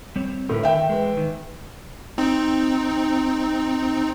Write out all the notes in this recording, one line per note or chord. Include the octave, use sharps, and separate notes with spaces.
G3 C4 C#5
A2 D3 A#4 B4
D#3 E5 G5
E3 G#3
D#3
C4 D#4